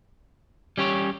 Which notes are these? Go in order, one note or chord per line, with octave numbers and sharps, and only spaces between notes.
G3 C#4 G4 C#5